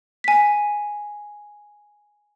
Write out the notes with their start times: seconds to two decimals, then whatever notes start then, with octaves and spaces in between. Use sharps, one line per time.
0.24 G#5 B6